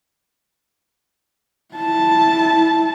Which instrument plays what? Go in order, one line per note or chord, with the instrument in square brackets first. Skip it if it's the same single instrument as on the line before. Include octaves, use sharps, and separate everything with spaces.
[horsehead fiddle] E4 A5